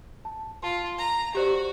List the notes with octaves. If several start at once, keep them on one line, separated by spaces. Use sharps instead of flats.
A5
F4 A5 C6
A#5
F#4 G4 C5 D5